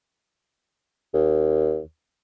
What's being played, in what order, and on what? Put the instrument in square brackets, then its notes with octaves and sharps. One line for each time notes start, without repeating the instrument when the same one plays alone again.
[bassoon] D#2